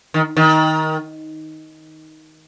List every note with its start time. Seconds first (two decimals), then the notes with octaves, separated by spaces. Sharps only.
0.14 D#3
0.37 D#3